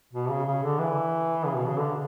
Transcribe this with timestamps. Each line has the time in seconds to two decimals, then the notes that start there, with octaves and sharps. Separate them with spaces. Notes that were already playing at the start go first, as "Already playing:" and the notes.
0.13 B2
0.30 C#3
0.46 C#3
0.63 D3
0.79 E3
1.46 C#3
1.55 B2
1.66 C#3
1.77 D3